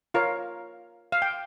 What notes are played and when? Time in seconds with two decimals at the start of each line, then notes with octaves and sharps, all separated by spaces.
0.14 F4 A#4 C#5 F5
1.12 F5
1.22 G5